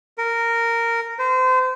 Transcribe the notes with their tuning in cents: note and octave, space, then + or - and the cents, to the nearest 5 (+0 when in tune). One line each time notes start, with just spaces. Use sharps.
A#4 -10
C5 -30